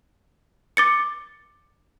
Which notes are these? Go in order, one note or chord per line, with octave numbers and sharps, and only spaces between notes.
D6 A6 C#7